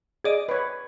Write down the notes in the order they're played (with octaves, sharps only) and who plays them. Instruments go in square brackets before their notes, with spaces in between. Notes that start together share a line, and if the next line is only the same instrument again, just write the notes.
[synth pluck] G#4 D5 D#5
[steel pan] B4 C#5